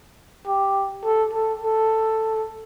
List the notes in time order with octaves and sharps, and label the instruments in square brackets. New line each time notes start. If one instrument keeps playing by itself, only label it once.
[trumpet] G4
A4
A4
A4